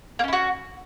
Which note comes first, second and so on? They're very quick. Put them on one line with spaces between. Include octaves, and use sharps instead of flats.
A#3 C#4 E4 F#4